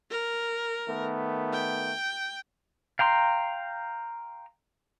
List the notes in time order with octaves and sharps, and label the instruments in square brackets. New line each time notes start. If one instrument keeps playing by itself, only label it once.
[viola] A#4
[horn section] D#3 A3 B3
[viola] G5
[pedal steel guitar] F5 G5 A#5 C6